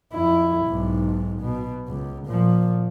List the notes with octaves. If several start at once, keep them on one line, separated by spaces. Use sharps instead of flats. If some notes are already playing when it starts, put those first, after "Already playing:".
F2 E4
B1 G#2
B2
C#2
A#2 F3